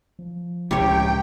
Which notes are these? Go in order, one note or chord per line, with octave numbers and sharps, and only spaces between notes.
F3
C#2 A2 C3 G4 C#5 G5